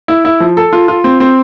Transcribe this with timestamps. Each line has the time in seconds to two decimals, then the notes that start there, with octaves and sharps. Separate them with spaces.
0.08 E4
0.25 E4
0.40 F3
0.57 A4
0.73 F4
0.88 F4
1.04 C4
1.20 C4